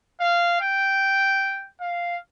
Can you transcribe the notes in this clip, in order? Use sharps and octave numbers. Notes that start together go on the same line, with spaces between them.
F5
G5
F5